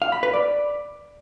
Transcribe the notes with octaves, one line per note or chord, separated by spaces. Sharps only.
F5
B5
B4
D5